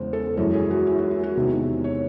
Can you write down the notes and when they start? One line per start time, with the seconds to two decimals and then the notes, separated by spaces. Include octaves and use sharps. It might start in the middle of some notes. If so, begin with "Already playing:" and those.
Already playing: E2 C#3 G#3 C5
0.13 A4
0.37 F#2 E3 G#3 A4
0.54 G#4
0.71 F#4
0.87 E4
0.99 F#4
1.11 F#4
1.23 F#4
1.36 E2 C3 D#3 G#3
1.84 C#5